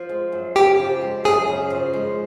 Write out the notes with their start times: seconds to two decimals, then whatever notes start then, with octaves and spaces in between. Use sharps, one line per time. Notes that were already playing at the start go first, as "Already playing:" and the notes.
Already playing: F3
0.09 G#3
0.32 F#2
0.55 C#3 G4
0.79 F3
1.01 G#3
1.24 F#2 G#4
1.48 C#3
1.70 F3
1.93 G#3